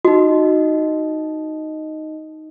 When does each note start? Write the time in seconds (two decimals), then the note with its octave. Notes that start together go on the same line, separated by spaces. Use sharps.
0.05 D#4 F#4 D#5